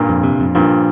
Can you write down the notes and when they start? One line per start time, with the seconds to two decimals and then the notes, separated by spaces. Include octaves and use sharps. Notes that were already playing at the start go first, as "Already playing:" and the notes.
Already playing: G2 A#2
0.09 F2
0.24 C3
0.40 F2
0.55 G2 A#2 F3